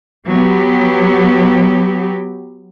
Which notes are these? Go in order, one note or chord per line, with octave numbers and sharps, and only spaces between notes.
F#3 B3 G4